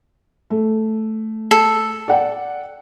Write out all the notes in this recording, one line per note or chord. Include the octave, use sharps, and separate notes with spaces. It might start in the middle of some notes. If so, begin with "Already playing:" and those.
A3
A4
D5 F#5 G5